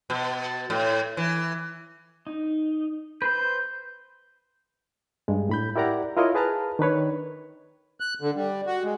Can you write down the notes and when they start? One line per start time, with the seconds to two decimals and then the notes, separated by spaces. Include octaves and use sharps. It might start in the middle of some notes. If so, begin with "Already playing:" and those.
0.10 B2
0.70 A2
1.17 E3
2.27 D#4
3.22 B4 C5 B5 G6
5.28 G2 G#3
5.49 A2 B5 G6
5.76 E4 G4 A#4 D5 F#5 A#5
6.17 E4 F4 A#4 C#5 D#5
6.35 G#4 B4 A5 A#5 F6
6.79 D#3 D4 B4 C#5
8.00 F#6
8.21 D3
8.35 G3
8.66 F#4
8.83 G#3